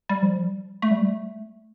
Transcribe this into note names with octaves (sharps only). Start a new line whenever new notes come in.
G3
F3
G3
A3
G3
A3